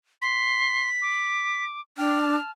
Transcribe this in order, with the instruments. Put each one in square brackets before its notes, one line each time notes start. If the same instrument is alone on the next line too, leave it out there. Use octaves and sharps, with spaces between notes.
[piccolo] C6 [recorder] B6
[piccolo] D6
[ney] D4 [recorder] G5 [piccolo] F6
[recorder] A5